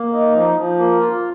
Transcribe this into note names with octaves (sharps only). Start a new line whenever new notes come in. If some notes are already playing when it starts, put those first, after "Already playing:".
Already playing: A#3
D#4
F3
F3
A#3
F4